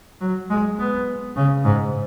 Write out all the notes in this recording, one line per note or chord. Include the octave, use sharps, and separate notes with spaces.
F#3
G#3
B3
C#3
G#2